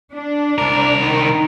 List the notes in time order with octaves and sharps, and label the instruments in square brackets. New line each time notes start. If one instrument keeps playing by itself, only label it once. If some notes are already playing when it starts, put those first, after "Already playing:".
[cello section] D4
[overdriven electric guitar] C2 A#4
[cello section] D#3